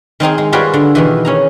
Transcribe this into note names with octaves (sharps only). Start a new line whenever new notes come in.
D#3 C4 D#4 G#4
G#3
G3 F4 F#4 G#4 B4 D5
D3
B2 D#3 E3
C#4 G#4 A#5